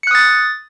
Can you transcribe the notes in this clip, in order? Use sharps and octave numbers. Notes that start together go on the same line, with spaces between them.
D#6 F#6 A6 C#7